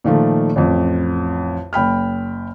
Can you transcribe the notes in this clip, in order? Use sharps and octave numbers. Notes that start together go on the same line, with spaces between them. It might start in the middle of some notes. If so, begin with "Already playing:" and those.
A#2 D#3 F3 A3
A1 F2
F#1 G5 B5 F6